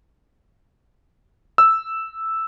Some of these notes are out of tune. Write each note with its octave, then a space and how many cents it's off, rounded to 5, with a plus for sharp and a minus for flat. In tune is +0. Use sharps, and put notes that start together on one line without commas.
E6 -5